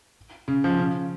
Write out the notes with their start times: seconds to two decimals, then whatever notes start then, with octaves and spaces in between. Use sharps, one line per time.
0.48 C#3
0.64 F3
0.79 C#3